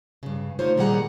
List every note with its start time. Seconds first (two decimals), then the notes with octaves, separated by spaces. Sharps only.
0.23 G2 C#3
0.59 D3 A3 D#4 F4 C5 C#5
0.77 A#2 D#3 G3 G#4 F#5 A#5